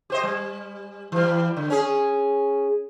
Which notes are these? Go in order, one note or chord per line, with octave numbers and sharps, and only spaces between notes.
G4 C5 D#5
G3
E3 G3
D3
C#4 G#4